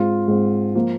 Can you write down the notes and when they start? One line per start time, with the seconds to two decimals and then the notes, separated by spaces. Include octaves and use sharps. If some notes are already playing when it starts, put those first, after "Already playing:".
Already playing: G#2 G#3 C4 F4
0.28 G#2 G#3 C4
0.75 F3 A#3